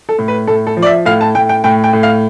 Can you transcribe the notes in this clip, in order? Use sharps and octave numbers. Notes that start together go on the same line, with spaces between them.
A4
A2
B4
A2 A4
A4
F3
D5
E5
A2 F5
A5
A2 G5
G5
A2 G5
G5
A2
F5